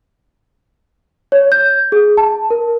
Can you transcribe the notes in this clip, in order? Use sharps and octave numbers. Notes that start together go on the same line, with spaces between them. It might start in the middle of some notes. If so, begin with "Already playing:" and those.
C#5
G6
G#4
A5
A#4